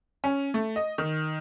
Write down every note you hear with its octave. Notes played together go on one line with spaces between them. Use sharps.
C#4
A3
D#5
D#3